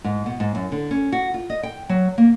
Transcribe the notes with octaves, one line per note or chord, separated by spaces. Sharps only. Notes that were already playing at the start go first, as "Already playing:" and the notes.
G#2
B2
G#2
F#2
D3
C#4
F#4
F4
D#5
G5
F#3
A#3